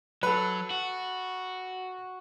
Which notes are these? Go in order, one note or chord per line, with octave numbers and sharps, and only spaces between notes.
F#3 A4 B4
F#4